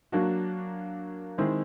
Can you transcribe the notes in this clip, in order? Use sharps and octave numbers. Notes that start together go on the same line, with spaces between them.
F#3 A#3 D4 F#4
D#3 G#3 C4 E4